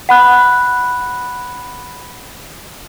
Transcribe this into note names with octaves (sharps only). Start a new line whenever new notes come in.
F#5 B5 F#6